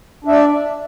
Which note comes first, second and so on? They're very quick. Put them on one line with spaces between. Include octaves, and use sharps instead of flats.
D4 E5 D5